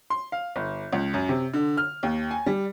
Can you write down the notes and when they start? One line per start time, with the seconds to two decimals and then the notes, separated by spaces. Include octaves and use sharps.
0.10 C6
0.32 F5
0.56 G1
0.93 C#2
1.14 F#2
1.29 C3
1.54 D3
1.77 F6
2.03 D#2
2.31 G#5
2.46 G3